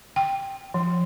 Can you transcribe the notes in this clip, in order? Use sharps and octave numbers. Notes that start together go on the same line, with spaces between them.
G5
F3